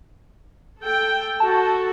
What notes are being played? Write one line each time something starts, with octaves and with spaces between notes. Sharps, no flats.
A4 G5
F#4 A4 A5